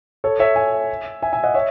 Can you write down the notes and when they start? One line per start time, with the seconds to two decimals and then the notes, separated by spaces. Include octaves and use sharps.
0.24 A4 C#5
0.39 C#5 E5
0.56 E5 G#5
1.22 E5 G#5
1.33 E5 G#5
1.44 D#5 F#5
1.54 C#5 E5